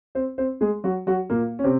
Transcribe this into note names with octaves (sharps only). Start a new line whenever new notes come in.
C4 C5
C4 C5
G#3 G#4
F#3 F#4
F#3 F#4
A#2 A#3
C#4
C3 C4